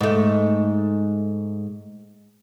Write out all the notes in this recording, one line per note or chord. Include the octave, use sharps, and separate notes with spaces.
G#2 A3